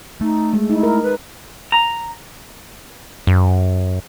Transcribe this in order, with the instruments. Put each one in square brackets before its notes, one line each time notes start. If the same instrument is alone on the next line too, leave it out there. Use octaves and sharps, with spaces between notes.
[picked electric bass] A3 [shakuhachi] D#4
[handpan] G#3
[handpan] D#4 [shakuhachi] E4
[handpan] A#4
[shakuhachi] B4
[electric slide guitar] A#5
[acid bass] F#2